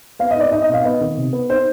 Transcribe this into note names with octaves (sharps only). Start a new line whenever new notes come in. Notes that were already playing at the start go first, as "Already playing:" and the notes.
B3 F5
D#5
D#4 D5
D#4 D#5
D#5
B2
F5
B3 D#5
D#3
C3
B3
D#4 C5